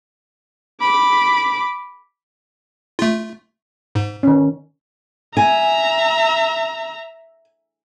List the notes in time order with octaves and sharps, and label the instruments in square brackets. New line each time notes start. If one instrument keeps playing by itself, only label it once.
[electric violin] B5 D6
[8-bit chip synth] A3 F4
G#2
[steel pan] D#3 C#4
[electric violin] E5 A#5 [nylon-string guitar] G#5